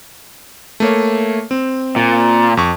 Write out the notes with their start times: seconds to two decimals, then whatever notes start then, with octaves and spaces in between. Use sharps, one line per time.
0.80 A3 A#3 C#5
1.51 C4
1.96 A#2
2.57 F2 C#6